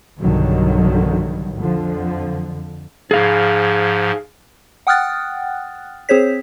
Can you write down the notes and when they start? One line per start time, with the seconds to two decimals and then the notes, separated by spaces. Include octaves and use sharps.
0.20 B1 G2 D3 D#3 F#3
1.58 F2 D3 F3
3.11 G#2 F3 G#4 F5
4.87 F#5 G5 D#6 F6 F#6 A6
6.09 C4 G#4 C5 C#5 B6